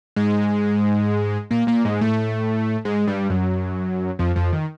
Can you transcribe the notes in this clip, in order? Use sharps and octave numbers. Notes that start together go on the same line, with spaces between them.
G#2 G#3
A#2 A#3
A#2 A#3
G#2 G#3
A2 A3
G#2 G#3
G2 G3
F#2 F#3
F2 F3
F2 F3
D#3